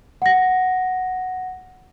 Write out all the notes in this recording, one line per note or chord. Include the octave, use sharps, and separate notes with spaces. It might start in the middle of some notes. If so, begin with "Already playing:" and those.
F#5 A#6